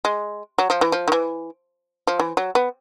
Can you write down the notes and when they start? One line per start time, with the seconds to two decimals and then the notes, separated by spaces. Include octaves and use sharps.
0.05 G#3
0.58 F#3
0.70 F3
0.81 E3
0.92 F3
1.08 D#3
1.12 E3
2.07 F3
2.20 E3
2.37 F#3
2.55 B3